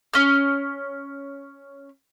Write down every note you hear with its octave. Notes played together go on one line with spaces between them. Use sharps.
C#4 F6